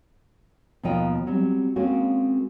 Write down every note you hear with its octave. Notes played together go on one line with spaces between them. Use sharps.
D#2 B2 F3 A#4 D#5 G5
F#3 G3 C4
G#3 A#3 C4 C#4 F#4